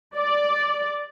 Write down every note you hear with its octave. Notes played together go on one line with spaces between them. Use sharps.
D5